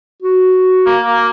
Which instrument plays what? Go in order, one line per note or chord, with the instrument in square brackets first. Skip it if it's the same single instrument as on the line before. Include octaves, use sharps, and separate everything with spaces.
[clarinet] F#4
[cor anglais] A#3
A#3